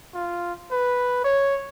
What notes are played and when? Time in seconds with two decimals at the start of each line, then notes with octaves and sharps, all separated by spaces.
0.14 F4
0.71 B4
1.24 C#5